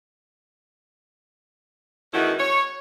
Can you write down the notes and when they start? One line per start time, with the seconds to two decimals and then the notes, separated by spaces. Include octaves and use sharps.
2.14 E2 D#3 A3 C#4 E4 F#4
2.39 C#5